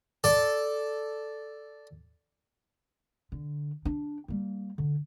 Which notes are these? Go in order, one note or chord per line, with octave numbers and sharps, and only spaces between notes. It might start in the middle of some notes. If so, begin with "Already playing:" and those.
A4 D5 A5
D3
D4
G3 A#3
D3